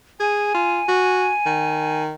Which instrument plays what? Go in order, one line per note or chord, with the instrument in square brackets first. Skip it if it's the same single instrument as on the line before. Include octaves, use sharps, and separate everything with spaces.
[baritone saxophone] G#4 [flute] G#5
[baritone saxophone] F4
F#4
D#3